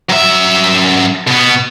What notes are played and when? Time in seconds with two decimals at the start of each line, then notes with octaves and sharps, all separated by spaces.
0.09 F#2 E5
1.27 B2 B3